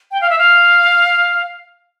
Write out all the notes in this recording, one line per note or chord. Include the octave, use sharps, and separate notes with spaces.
G5
F5
E5
F5